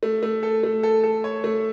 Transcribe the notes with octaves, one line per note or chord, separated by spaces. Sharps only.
A3
A3
A4
A3
A4
A4
C#5
A3